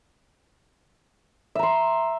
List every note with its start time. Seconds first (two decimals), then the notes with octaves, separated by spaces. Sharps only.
1.55 E5
1.59 A#5
1.63 C6